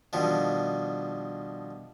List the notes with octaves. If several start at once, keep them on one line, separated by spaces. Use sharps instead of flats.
G2 B2 D#3 F3